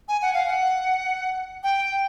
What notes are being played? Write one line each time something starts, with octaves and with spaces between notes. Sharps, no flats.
G#5
F#5
F5
F#5
G5